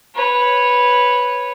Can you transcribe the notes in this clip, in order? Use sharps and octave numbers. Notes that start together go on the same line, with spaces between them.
B4 C#5